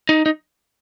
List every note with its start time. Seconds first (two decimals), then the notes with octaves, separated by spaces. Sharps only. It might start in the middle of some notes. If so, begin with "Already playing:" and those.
0.09 D#4
0.26 D#4